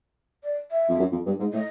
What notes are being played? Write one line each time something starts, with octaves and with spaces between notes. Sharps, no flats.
D5
E5
F2
F#2
F2
G2
G#2
A2 D#5